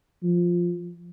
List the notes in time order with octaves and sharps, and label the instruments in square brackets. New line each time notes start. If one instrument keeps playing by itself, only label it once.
[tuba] F3